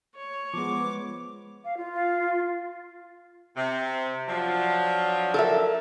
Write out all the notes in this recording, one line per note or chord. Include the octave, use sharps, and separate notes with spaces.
C#5
F3 G#3 B3 D6
F5
F4
F5
C3
F3 F#3 D4
A4 A#4 E5